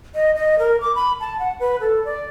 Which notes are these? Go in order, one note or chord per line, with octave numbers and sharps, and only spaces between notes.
D#5
D#5
A#4
D6
B5
A5
F#5
B4
A4
D5